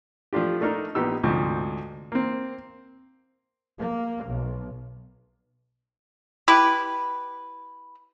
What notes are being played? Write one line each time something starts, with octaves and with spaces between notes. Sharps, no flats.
F3 A3 D4 F4 G4
A3 D4 D#4 A#4
A#1 B3 D#4 G4 E6
D2 G#2 C3 F3
A#3 C4
A#3
B1
E4 G4 B4